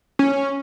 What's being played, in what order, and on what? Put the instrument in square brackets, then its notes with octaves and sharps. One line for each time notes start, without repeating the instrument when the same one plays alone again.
[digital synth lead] C#4